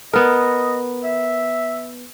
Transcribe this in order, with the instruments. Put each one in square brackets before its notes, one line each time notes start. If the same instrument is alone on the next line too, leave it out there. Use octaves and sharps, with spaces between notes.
[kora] B3 A#4 [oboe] D#5
[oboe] E5